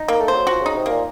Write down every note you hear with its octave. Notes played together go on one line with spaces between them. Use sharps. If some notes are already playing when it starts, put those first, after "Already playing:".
Already playing: D#4
A#3
A3
C5
F#3
F3 F#4
C#3 D#4
C3
A#2 A#3